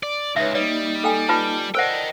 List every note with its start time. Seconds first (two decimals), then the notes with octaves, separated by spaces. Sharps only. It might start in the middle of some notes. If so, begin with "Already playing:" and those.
0.03 D5
0.36 C#2 D#4 B4 C#5 E5
0.55 G3 A#3 D#4 D5 D#5
1.04 A4 G5 G#5
1.29 F4 B4 A5
1.75 A#4 C5 D5 D#5 F#5 G5 A5